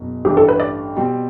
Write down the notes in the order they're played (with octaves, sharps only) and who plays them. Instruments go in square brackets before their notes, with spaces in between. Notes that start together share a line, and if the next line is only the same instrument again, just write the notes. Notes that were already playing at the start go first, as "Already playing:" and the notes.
Already playing: [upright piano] F#1 B2
[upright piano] A1 G2 E3 A3 D4 [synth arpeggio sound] G4
[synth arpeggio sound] A4
B4
D5
[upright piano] B2 G3 C4